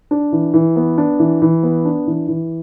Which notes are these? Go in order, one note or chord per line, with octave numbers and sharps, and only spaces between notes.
D4
E3
E3
B3
D4
E3
E3
B3
D4
E3
E3